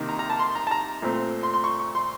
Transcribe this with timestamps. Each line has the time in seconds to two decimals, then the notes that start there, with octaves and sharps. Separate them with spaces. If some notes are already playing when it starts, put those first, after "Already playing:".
Already playing: C3 D#3 A#3 D#4
0.09 A#5
0.19 A#5
0.30 A5
0.39 C6
0.55 A#5
0.67 A5
0.71 A#5
1.02 A#2 A3 C4
1.43 C6
1.54 C6
1.64 C#6
1.80 C#6
1.95 C6